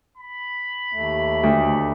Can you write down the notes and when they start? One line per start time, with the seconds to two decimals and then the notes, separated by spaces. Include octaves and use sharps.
0.17 B5
0.93 D#2 A3
1.43 D2